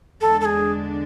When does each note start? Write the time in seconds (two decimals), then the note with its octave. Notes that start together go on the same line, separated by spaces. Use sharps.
0.21 E2 D3 G#3 D4 A4
0.41 A4
0.45 G#4